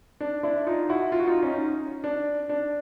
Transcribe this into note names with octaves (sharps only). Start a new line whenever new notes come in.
D4
D4 E4
D#4 F4
E4 F#4
F4
F#4
D#4 F4
C#4 D#4
D4
D4